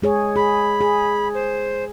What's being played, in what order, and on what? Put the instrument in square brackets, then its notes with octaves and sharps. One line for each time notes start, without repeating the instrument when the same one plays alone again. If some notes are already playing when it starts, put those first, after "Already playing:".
[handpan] G#3 G#4 C#5
[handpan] G#4 [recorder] B5
[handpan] G#4
[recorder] C5